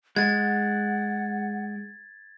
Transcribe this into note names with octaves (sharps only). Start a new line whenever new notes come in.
G#3 F#5 G#6 A6